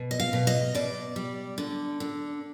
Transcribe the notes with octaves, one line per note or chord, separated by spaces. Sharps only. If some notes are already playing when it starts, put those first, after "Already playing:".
Already playing: B2
D#5
F5
B2
D#5
B2 D5
G3
D3
D3